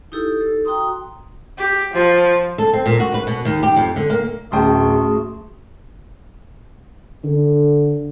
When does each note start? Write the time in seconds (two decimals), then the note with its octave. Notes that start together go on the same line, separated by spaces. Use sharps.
0.12 D#4 E4 G4 A4 E6
0.41 A4
0.65 F#4 G5 A#5 C6 D#6
1.58 G4
1.94 F3
2.58 A4
2.73 C4
2.86 A#2
3.00 F#4
3.14 B4
3.27 B2
3.45 D#2
3.63 G4
3.76 F2
3.96 D3
4.10 A#3
4.52 D1 A3 C#4 F#4 G#4 G5 A5 C6
7.24 D3